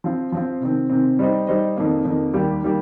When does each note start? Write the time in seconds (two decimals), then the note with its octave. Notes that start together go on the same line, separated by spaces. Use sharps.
0.04 F3 C4 F4
0.32 F3 C4 F4
0.61 C3 D#3 C4
0.90 C3 D#3 C4
1.19 G3 D#4 C5 D#5
1.47 G3 D#4 C5 D#5
1.77 F2 D#3 A#3
2.05 F2 D#3 A#3
2.33 D#2 D#3 G3 A#3 G4
2.63 D#3 G3 A#3 G4